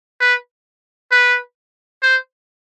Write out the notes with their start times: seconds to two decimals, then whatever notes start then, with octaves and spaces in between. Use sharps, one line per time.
0.21 B4
1.12 B4
2.03 C5